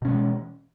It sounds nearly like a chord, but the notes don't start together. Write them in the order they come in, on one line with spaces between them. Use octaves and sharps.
B2 C#4 G#3 E3